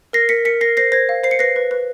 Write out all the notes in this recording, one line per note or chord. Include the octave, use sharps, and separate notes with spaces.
A#4 A#6 C7
A#4 B6 C#7
A#4 B6 C#7
A#4 A#6 C7
C5 A#6 C7
C5 G#6 A#6
F5
C5 C7
C#7
B4 A#6 C7
B4
B4